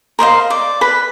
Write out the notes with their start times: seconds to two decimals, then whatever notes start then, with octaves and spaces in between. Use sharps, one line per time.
0.19 A#4 C5 D#5 F5
0.50 D5
0.81 B4 B5